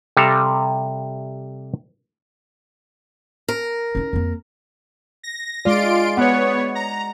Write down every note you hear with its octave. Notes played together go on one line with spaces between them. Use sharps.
C3 G3 A4 F5 A#5
A#4
C#4 D#4
F2 A#3
A#6
G#3 F4 D5 C6 D7
B3 C#5 F#5
A#5